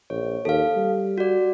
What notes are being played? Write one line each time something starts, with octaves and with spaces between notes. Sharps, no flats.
A#1 C#5
D#2 A4 F5
G3
F#4 D5